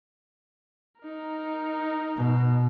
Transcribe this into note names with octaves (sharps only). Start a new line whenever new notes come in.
D#4 A#4
B2